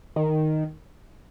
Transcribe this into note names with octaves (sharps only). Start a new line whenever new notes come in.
D#3